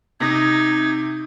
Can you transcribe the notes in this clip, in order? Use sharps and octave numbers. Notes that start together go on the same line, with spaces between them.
C3 D#4 G#6 A#6